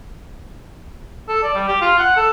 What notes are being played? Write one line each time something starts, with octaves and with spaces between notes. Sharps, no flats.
A4
D5
G3
G4
F4
F#5
A4